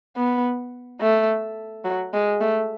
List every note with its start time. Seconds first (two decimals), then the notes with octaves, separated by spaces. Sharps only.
0.16 B3
1.01 A3
1.85 F#3
2.13 G#3
2.41 A3